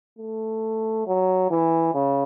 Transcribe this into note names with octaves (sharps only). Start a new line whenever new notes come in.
A3
F#3
E3
C#3